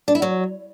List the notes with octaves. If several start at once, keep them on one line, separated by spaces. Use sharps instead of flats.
D4
E4
F#3